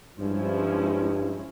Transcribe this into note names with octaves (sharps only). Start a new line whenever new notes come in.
G2 F3 G#3 C#4 E4